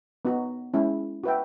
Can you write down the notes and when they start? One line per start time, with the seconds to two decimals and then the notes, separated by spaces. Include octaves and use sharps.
0.25 B3 D#4 F#4
0.74 G#3 C#4 E4
1.24 F#4 B4 E5 G5